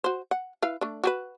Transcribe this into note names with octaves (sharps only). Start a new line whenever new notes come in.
F#4 C5
F#5
E4 B4 F5
A3 D4
F#4 G4 B4